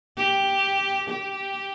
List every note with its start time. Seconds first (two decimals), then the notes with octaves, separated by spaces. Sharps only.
0.17 G4
1.09 G4